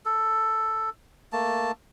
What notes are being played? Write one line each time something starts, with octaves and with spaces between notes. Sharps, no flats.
A4
A3 A#3 A5